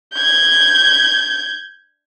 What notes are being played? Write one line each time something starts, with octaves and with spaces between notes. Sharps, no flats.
G6 G#6